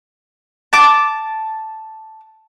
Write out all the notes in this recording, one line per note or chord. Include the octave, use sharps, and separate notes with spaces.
A5 D6